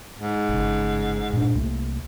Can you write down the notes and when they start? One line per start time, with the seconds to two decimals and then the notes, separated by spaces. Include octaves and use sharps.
0.19 G#2
0.49 G1 C#3
1.33 G2 A#2 D4
1.55 C2 A3 A#3